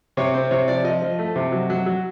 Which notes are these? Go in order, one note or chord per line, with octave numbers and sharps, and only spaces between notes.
C3 C#5
C4 C5
C3 C#5
F3 D5
F3 D#5
F3
A3
C3
F#3
F#3
F#3